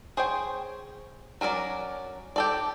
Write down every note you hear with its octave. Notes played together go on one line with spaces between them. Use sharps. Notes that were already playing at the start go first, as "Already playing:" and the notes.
G#4 C5 C#5 G5
F#3 C#4 A#4 D5
G4 A4 D5